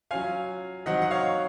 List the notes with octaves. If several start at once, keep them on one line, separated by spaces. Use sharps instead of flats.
F#3 C#4 F4 F5 G#5
D#3 F#3 C4 D#5 F#5
F#5
C#5 F5